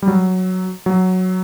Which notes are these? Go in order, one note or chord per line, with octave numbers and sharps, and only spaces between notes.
G3
F#3
F#3